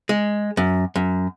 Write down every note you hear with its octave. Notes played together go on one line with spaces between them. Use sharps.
G#3
F#2
F#2